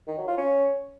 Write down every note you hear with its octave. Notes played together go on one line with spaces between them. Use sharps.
D#3
F#3
F4
C#4